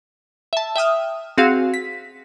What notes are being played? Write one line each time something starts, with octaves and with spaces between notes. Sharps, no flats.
E5 A5
E5 G5 D#6 F6
C4 F#4 G#4 F5
B6